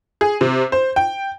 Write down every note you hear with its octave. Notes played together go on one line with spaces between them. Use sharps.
G#4
C3
C5
G5